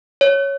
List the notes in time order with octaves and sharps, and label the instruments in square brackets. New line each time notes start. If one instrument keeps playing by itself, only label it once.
[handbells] C#5